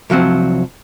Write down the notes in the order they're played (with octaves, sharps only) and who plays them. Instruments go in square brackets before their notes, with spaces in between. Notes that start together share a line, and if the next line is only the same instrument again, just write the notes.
[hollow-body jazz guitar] C2 F3 F#3 C4